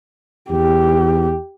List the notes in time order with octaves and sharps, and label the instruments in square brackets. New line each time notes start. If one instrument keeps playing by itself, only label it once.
[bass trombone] E2 [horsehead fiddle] G4